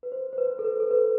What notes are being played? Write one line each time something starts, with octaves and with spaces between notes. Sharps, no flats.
B4
C5
C5
B4
A4
B4
A4
B4